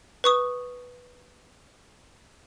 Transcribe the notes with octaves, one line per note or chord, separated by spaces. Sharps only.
B4 C#6 D#6